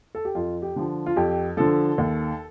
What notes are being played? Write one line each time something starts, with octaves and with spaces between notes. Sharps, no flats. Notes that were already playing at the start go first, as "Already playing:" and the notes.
A4
G4
F2 F4
G4
D3 F3
F4
F2 G4
D3 F3 A4
D#2